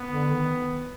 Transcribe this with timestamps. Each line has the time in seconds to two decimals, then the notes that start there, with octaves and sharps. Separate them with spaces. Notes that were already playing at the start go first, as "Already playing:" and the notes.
Already playing: B3
0.10 D3
0.32 D#3